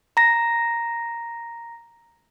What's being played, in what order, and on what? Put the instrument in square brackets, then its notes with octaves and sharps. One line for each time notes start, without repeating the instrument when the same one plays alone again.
[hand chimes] A#5 A#6